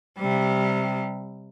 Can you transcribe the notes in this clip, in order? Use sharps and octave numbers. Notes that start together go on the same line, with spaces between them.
C3 G3